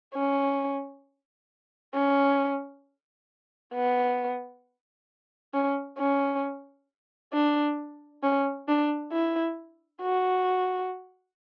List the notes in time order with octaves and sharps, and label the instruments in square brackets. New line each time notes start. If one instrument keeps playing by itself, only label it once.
[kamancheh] C#4
C#4
B3
C#4
C#4
D4
C#4
D4
E4
F#4